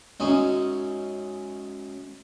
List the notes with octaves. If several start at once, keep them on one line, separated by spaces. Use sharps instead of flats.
F#2 G#3 C#4 D#4